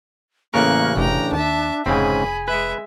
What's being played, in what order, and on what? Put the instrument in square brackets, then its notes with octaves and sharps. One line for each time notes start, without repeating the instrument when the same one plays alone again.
[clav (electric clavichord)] A1 C#3 A#4 [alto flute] A#3 [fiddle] C#6 F#6
[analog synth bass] F1 [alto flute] D4 [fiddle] G5 A#5
[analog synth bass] D#2 [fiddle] E5 A5
[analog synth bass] F1 [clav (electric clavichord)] G#2 C#3 C4 [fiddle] G#4 B5 [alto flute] G#5
[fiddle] G#3 E5 [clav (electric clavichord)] B4